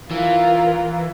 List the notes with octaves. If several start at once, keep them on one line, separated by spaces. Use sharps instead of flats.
E3 F4 A#4